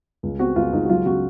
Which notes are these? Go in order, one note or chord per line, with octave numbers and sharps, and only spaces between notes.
C#2
C4 F#4
C#2 F4
C#2 D#4
F#4
F#3 F4
C#3 F#4